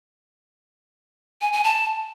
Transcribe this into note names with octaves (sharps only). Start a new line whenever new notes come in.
G#5
G#5
A5